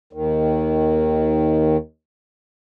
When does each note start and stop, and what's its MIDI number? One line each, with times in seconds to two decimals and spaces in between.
0.13 1.77 39
0.13 1.77 51